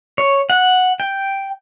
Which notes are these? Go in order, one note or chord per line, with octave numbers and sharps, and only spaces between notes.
C#5
F#5
G5